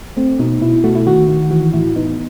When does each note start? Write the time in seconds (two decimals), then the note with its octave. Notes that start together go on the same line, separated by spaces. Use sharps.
0.17 A3 C4
0.39 B2 D#4
0.62 B2 E4
0.84 A3 F#4
0.95 E4
1.06 D#3 F#4
1.29 D#3
1.51 E3 F#4
1.73 A2 E4
1.96 B3 D#4